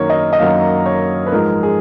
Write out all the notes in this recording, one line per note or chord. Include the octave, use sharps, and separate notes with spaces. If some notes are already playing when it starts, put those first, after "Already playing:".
Already playing: F#2 D#3 F#3 A#3 A#4 C#5
D#5
D#5
F#2 D#3 F#3 A#3 F5
C#5
B4
G#2 F3 G#3 A#4
G#4